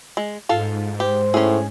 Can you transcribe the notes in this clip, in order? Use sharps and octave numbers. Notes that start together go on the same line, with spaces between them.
G#3
G#2 F4 A4 F5
G4 C5
A2 C#4 G#4